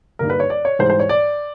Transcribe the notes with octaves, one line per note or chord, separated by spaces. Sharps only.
G2 D3 G3 A#3 D#4 A#4
B4
C#5
D5
C#5
G#2 E3 G3 C5
C5
C#5
D5